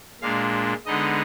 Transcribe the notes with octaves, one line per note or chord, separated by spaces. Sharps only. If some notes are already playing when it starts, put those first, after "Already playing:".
A#2 G#3 D4 F5
D3 G#3 B3 D#4 D#5